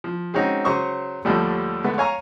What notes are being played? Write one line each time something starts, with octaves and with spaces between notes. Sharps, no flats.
F3
G#3 C4 C#4 D#4 F#4
C#3 F#3 C5 C#6 D#6
D#2 A2 D3 F3 G3 A3
D3 G#3 A3 B3
C#5 F5 G#5 A#5 C#6